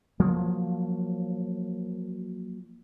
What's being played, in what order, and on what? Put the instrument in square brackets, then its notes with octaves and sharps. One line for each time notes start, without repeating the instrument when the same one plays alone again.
[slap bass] F3 F#3 A#3